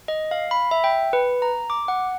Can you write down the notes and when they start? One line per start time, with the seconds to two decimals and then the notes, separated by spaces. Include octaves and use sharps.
0.08 D#5
0.31 F5
0.51 B5
0.71 E5
0.84 G5
1.13 B4
1.42 A#5
1.70 D6
1.88 F#5